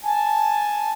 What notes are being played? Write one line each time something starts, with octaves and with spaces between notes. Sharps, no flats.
G#5 A5